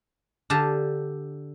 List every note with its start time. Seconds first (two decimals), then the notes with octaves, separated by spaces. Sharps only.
0.50 D3 G4 F5 A5 A#5